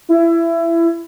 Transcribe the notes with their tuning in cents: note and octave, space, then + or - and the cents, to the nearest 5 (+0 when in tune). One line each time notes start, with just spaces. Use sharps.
E4 +20